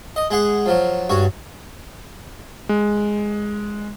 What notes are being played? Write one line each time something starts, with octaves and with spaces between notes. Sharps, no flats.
D#5
G#3 G#4 F#5
F3 F#3
G2 F#4 C#5
G#3